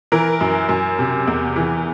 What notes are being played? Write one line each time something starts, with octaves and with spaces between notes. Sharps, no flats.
E3 A#4
F#2
F#2
C3
E2
E3